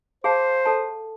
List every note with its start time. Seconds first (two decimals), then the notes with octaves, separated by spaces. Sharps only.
0.24 G#4 C5 F5 A5
0.66 A4 A5